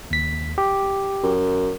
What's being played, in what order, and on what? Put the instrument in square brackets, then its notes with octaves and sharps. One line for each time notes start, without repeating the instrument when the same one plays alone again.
[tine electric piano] D#2 B6
G4
[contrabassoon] F#2